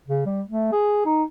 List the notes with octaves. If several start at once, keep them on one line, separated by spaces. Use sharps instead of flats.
C#3
G3
A3
G#4
D#4